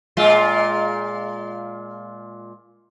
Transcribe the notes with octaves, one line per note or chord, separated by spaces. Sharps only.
A#2 G#3 F4